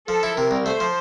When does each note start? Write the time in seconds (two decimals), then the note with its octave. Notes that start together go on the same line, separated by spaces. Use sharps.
0.08 F3 A4
0.23 E4
0.37 C3 A#4
0.51 C2
0.66 A3 C5
0.80 F3